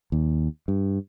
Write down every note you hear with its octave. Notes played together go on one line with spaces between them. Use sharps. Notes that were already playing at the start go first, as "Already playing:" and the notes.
D#2
G2